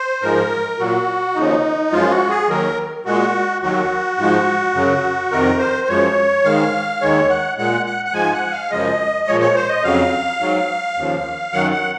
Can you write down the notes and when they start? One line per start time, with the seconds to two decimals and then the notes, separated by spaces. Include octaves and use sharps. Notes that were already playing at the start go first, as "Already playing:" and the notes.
Already playing: C5
0.22 G#2 F3 G#3 A#4
0.79 A#2 F#3 F#4
1.35 D#2 C#3 F3 D#4
1.92 F#2 F3 G#3 F4
2.10 F#4
2.29 G#4
2.48 D#2 D#3 F#3 A#4
3.05 A#2 G#3 F#4
3.62 D#2 D#3 F#3 F#4
4.18 G#2 F3 G#3
4.74 F#2 C#3 F#3
5.31 F2 C3 D#3 A#4
5.59 C5
5.88 F#2 F3 G#3 C#5
6.44 G#2 D#3 G#3 F5
7.01 D#2 D#3 G#3 C#5
7.29 F#5
7.58 A#2 G#3 F#5
7.86 F#5
8.05 F#5
8.13 G#2 F3 G#3 G#5
8.33 F#5
8.52 F5
8.70 F#2 C#3 F3 G#3 D#5
9.27 A#2 F3 G#3 C#5
9.41 C#5
9.55 C5
9.69 D#5
9.83 F2 C#3 F#3 F5
10.40 G#2 F#3
10.97 D#2 C#3 F3
11.53 F#2 D#3 F#3 F#5
11.72 F#5